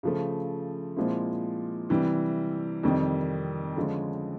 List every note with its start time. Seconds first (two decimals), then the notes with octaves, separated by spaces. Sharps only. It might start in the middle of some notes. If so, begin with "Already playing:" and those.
0.03 C#3 F3 A3
0.96 A#2 F3 G#3 C4 E4
1.89 C3 E3 G3
2.83 F2 C3 D#3 G3
3.76 D3 F3 G#3 C#4